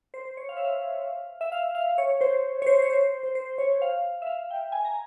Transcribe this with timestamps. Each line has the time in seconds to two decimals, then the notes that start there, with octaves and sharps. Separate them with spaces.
0.14 C5
0.25 C5
0.37 C#5
0.49 F5
0.57 E5
0.65 F5
1.41 E5
1.52 F5
1.75 F5
1.98 C#5
2.21 C5
2.62 C#5
2.67 C5
2.82 C#5
2.90 C5
3.01 C5
3.23 C5
3.35 C5
3.58 C#5
3.82 F5
4.22 E5
4.27 F5
4.51 G5
4.72 G#5
4.85 A#5